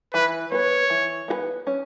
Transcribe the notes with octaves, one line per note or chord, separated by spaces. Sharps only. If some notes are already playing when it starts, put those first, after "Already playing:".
E3 B4
B3 F#4 B4 C#5
E3
B3 F#4 B4
C#4